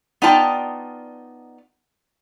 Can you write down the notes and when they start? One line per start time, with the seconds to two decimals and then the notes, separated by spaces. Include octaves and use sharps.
0.22 B3 D#4 F4 D5 G5 A5